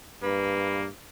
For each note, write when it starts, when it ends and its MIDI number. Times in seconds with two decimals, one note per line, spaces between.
0.23 0.87 43
0.23 0.88 58
0.23 0.84 71